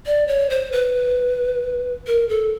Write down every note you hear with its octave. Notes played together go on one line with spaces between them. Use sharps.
D5
C#5
C5
B4
A#4
A4